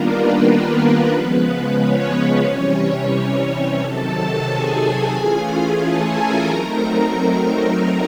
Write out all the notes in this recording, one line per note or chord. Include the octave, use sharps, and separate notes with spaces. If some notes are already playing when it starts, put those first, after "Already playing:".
Already playing: D#3 G3 A#3 B3 D4 F4 A#4
B3 B4
B3 B4
C#3 F3 G#3
C#4 C#5
C3 E3 G3
C3 D#3 F#3 A4 A5
A4 A5
G#4 G#5
E3 A3 C#4 F4 G#4 G#5
A4 A5
A#4 A#5
F#3 A3 C4 D#4
A#4 A#5